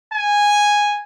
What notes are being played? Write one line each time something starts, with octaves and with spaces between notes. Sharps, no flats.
G#5